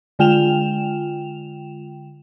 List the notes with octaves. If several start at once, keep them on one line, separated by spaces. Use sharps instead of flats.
D3 G#3 F4 G5 E7 F7